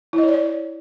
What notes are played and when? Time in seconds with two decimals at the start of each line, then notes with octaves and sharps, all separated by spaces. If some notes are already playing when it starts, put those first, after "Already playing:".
0.13 E4
0.18 D#5
0.23 C#5
0.28 D5
0.34 C#5